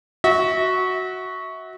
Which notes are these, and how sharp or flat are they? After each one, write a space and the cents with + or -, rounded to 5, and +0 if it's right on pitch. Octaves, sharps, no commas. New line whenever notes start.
F#4 +0 E5 -30